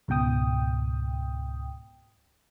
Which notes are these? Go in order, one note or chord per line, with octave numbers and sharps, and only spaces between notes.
C#2 G#2 B2 G5 D#6